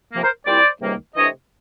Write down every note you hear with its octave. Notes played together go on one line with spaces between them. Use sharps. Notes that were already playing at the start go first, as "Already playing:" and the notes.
C3 F3 A#3
A#4 C5
A#2 G3 C4 E4 C5 D5
C#2 C3 D#3 G3 A#3
C3 E3 A3 D4 C#5 D#5